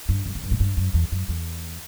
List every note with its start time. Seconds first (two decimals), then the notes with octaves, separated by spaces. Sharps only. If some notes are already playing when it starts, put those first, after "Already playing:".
0.09 G2
0.26 F#2
0.35 E2
0.43 F#2
0.51 A2
0.60 G2
0.77 F#2
0.94 E2
1.12 F#2
1.29 E2